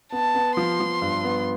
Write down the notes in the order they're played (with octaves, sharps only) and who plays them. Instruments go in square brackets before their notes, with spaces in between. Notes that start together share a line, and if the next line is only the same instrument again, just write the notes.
[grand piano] B3 [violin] A5
[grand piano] B3
[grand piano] F3 [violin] C6
[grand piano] F3
G2
B3